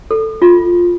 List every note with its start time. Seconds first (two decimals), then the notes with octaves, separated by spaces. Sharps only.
0.11 A4
0.42 F4